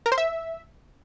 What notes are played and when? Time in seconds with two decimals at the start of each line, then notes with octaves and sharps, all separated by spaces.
0.06 A#4
0.12 C5
0.18 E5